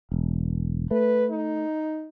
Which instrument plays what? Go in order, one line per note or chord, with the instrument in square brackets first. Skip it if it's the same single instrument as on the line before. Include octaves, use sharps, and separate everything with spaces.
[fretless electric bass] E1
[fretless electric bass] A3 [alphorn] B4
[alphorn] D#4